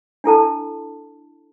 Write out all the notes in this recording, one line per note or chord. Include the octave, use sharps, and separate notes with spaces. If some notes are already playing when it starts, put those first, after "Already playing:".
D4 E4 A4 A5